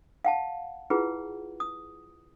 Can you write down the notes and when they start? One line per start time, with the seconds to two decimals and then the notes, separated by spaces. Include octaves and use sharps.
0.25 F5 F#5 A5
0.90 E4 F4 G#4 B4 F#5
1.60 D#6